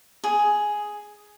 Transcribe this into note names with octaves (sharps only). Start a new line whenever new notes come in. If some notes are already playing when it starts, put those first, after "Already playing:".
G#4